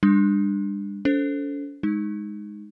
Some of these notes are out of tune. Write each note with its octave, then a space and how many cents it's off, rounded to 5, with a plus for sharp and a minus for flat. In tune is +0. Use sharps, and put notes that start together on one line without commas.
G3 +40 D4 +15
C#4 +45 A4 +0 C5 +0
G#3 +0 D#4 +0